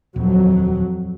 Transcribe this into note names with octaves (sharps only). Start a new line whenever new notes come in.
D#1 F2 F#3